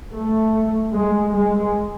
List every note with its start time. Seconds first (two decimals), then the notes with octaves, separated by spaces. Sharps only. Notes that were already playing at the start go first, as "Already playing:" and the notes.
0.14 A3
0.92 G#3
1.31 G#3